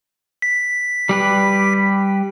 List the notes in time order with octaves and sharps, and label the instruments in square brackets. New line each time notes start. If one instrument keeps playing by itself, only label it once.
[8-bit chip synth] B6
[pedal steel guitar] G3 G4 B4